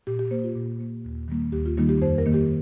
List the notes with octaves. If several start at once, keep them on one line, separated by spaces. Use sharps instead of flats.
A#2 G4
G4
A#3 C5
F4
A#2
A#3
D#2
D#3 G3 A#3
D#2 G4
F4
D#3 G3 A#3 D#4
G4
F2 C5
A#4
D#3 A#3
G4